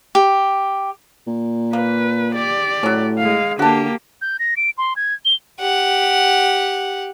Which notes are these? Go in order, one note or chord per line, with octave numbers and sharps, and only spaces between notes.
G4
A#2
A#3 B4
G4 D5
A2 F#3 C#4
G#3 F5
D3 A#3 F#4 G4 A5
G6
A#6
D7
C6
G#6
G7
G4 F#5